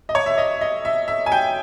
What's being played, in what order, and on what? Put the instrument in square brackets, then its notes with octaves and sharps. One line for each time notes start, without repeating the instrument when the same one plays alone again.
[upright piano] D#5
C#5
E5
D#5
D#5
E5
E5
G#5
G5